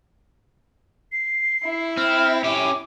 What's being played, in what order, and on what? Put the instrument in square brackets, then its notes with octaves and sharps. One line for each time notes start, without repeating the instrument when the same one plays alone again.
[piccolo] C7
[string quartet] E4
[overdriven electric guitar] C4 [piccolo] F6
[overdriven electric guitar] C#4 G4 [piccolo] D6